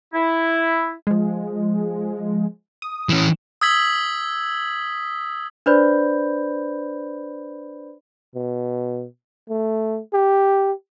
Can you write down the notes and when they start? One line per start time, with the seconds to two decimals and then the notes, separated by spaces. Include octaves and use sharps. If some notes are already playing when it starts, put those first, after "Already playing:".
0.14 E4
1.07 F3 G#3
2.82 D#6
3.09 E3 C#4
3.61 D#6 E6 G#6 B6 F#7
5.66 D4 B4 C5 D5 B5 G6
8.35 B2
9.50 A3
10.13 G4